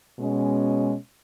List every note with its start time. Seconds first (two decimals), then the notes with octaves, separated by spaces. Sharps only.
0.19 B2 G#3 C#4